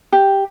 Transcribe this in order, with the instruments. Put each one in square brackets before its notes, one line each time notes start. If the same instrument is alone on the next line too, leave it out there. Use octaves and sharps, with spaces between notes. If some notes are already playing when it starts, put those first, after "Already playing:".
[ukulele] G4